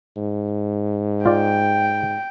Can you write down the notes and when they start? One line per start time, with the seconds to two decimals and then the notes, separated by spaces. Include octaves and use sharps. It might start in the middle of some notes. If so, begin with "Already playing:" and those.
0.17 G#2
1.26 F4 D5 G5